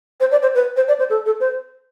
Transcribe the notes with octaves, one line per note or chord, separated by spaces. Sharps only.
C5
D5
C5
B4
C5
D5
C5
A4
A4
C5